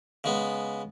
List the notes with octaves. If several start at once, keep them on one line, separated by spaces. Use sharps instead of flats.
C#3 G#3 B3